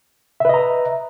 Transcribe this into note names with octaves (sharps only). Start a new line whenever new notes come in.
B4 D#5 E5 A#5